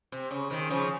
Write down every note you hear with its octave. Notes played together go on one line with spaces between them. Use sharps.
C3
C#3
C3 D#3
C#3 F3